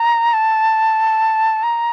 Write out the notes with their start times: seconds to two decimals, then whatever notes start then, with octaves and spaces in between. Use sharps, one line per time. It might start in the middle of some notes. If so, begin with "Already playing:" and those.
Already playing: A#5
0.33 A5
1.63 A#5